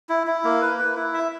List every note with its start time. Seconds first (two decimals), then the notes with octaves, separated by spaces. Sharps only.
0.09 E4
0.27 E4
0.44 A#3
0.61 B4
0.79 B4
0.96 E4
1.14 E5